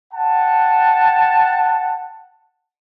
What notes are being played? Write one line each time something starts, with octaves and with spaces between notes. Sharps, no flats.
F#5 G5 A5